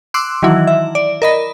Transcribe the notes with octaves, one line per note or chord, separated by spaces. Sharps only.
C6 D6 E6 F#6
D#3 E3 F#3 E4
E5
D5
A#4 D#5 B5